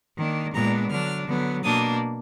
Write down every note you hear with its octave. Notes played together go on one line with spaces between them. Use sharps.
D#3 A#3 D4
A#2 G#3 B3 D4 A#5
D3 F#3 D4 F6
D3 F#3 B3
B2 A#3 D4 D#6